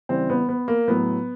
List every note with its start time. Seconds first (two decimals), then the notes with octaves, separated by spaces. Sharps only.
0.09 C#3 E3 G3 C4
0.30 B3
0.49 B3
0.68 A#3
0.88 A2 F#3 B3